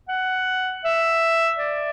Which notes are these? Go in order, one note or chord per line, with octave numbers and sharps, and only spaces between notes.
F#5
E5
D5